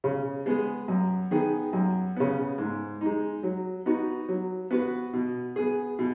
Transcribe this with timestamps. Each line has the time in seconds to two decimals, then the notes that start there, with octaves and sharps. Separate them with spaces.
0.04 C#3
0.46 G#3 B3 G#4
0.88 F#2
1.31 D#3 B3 G#4
1.73 F#2
2.16 C#3 B3
2.58 G#2
3.01 G#3 D#4
3.43 F#3
3.86 B3 D#4 F#4
4.29 F#3
4.71 B3 F#4 B4
5.13 B2
5.56 B3 G#4
5.99 B2